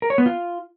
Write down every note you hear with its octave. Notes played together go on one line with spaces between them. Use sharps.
A#4
C#5
B3
F4